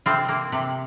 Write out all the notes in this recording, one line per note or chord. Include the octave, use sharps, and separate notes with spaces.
C3 C4 F4
A#3
C3